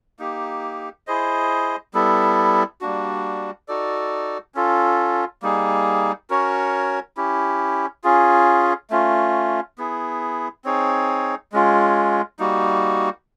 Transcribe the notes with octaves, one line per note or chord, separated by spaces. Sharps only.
A#3 D#4 G4
E4 G#4 C5 D#5
G3 B3 E4 A4
G3 A#3 D4 F#4
D#4 F#4 A4 D5
C#4 F4 A4
G3 A#3 D#4 G#4
C#4 F#4 A#4 C#5
C#4 E4 G4
C#4 F4 G#4
A3 C#4 F4
B3 E4 G#4
C4 D#4 G#4 C#5
G#3 C#4 F4
G3 A#3 D#4 F#4